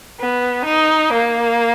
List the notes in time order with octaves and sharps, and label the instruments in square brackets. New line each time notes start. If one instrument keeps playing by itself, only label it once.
[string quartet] B3
D#4
A#3